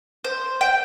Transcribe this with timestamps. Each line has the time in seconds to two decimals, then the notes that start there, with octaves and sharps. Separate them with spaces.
0.24 C5
0.61 G5